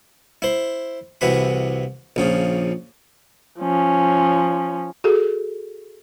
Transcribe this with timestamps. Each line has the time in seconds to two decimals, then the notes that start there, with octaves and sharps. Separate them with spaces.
0.42 E4 C5
1.21 C2 C3 E3 F#4 B5
2.16 A#1 C#3 F3
3.60 F3 C#4
5.04 F#4 G#4 A4